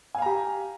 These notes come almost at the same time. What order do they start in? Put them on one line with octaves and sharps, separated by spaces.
G#5 F5 A#5 G4